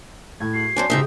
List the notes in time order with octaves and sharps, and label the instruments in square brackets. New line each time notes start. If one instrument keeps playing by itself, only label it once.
[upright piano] A2 A3 [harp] G#6
[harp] F#4 [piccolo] C7
[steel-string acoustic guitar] F#3 C4 D4 [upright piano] G#5 A5
[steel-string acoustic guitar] G#2 D#4 E5 [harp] C#3 G4 D#6